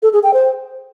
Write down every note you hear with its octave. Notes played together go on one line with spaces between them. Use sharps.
A4
G#4
G5
C5